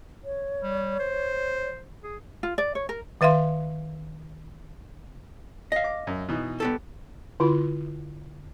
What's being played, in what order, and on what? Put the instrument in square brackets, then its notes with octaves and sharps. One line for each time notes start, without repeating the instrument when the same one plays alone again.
[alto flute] C#5
[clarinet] G3
C5
G#4
[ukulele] F4
D5
C#5
A#4
[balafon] D#3 B4 E5 F5 C6
[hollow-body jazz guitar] D#5 F5
[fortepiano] D6
F#2
B2 E3 D#4
[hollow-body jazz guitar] B3 G4 A4
[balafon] D3 E4 F4 B5